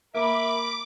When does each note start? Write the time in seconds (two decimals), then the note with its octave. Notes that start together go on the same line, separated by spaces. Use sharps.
0.14 A#3 A#4 E5 B5 D6